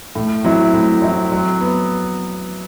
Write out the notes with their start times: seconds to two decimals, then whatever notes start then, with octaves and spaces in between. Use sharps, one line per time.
0.15 A2
0.44 F#3 C4 E4
0.73 A2
1.02 F#3 C4 E4
1.32 F#3
1.61 B3